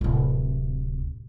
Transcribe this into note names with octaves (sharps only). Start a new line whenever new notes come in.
D1 C3